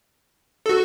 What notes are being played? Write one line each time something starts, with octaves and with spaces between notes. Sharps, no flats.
A4
F#4